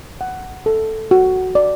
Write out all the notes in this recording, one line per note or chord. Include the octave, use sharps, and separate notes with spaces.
F#5
A4
F#4
D5